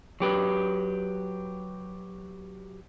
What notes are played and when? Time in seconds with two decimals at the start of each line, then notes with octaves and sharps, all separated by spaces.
0.20 F#3 G4 B4